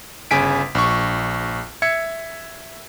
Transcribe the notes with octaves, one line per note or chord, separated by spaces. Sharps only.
G1 C#3 G#5 B6 D7
A#1 C#6
E5 G#6 C#7